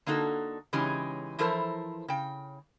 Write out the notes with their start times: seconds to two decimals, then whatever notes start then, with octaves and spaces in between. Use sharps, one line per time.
0.06 D3 A#3 D#4 F#4 A4
0.73 C#3 E3 G#3 C#4 D#4 G4
1.39 E3 F3 E4 A4 A#4 C5
2.08 C#3 G5